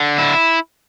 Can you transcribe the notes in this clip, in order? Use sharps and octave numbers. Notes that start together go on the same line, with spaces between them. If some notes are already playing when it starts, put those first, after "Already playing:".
Already playing: D3
E4